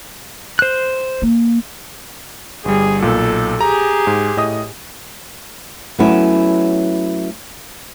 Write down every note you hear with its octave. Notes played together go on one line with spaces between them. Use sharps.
C5 F#6
A#3
G1 G3 G#4
B1 A#2 A4
G4 G#4 A#5
G#2
A2 D#5 D#6
F#3 A3 B3 C#4 E4